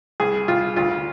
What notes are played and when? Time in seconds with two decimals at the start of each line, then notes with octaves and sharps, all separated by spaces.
0.20 C2 G#4
0.48 C2 F4
0.76 D2 F4